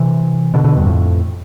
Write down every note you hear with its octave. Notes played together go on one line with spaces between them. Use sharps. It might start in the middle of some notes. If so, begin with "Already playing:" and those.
Already playing: C3 E3
B2 D3
B2 D3
E2 G2
F2 A2